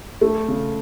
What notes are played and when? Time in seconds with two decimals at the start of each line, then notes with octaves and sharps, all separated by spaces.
0.21 A3
0.48 C#3